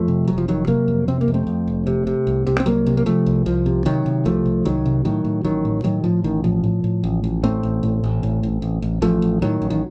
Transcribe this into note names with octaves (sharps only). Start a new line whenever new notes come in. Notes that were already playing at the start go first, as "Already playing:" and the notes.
Already playing: F2 F3 A3
C3
F1 F#3
F3
F2 D#3 F#3
C3 F#3 A#3
F2
C3 C4
A#3
F2
A3 C4
F2
F1
C3
C3
C2
C3
C4
C2 F#3 A#3
C3
A#3
C3 F3 A3
C2
C2 F3
C3
C3 D#3 F#3
C3
C2 F3 A3
C2
C2 D#3 F#3
C3
A2 D#3 F#3
A2
A1 D#3 F#3
A2
A2 D#3 F#3
A2 F3
A1 D#3
A2 F3
A2
A2
A1
A1
A2 A3 C4
A1
A2
A1
A2
A1
A1
A1
A1 F3 A3
A1
A2 D#3 F#3
A1
D#3